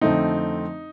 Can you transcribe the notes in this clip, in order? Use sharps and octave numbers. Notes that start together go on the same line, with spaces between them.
F2 D3 A3 C4 D#4